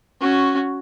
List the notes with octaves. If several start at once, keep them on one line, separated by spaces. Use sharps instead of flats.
C#4 F#4